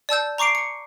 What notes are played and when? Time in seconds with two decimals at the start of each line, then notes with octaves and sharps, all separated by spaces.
0.09 D5 A5 E6 G6
0.38 A#5 C#6 D6 C7 D7
0.55 C#7